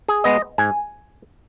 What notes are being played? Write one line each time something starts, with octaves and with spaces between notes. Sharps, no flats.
G#4
G#3 B3 D#5
G#2 G#5